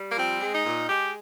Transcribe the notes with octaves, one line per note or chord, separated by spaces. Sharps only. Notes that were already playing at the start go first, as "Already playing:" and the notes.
Already playing: G3
A#3
F3 C4
G#3
D#4
A#2
G#3 G4